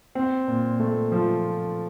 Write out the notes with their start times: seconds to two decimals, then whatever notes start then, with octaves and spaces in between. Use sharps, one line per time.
0.15 C4
0.48 A#2
0.80 A3
1.12 F3